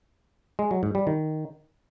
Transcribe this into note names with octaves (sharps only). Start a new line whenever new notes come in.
G#3
F#3
G#2
G3
D#3